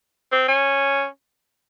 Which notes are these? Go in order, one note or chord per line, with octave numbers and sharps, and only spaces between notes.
C4
C#4